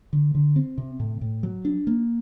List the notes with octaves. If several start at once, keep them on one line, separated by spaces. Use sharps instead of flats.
D3
D3
C4
C3
A2
A2
F#3
D4
A#3